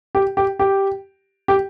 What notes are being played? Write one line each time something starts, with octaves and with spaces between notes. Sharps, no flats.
G4
G4
G4
G4